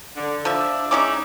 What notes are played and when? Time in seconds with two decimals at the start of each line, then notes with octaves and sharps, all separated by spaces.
0.16 D3
0.45 F3 D4 E5
0.91 G#3 C#4 D#4 E4 D6